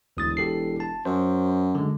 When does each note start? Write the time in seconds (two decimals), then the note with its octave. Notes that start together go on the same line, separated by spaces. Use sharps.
0.17 E1 D2 D#6 A6
0.37 G4 A4 C7
0.80 A5
1.05 F#2 C5
1.75 D3 G#3